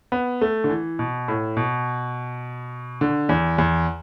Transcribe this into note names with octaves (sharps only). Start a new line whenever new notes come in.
B3
A3
D3
E3
B2
A2
B2
D3
E2
E2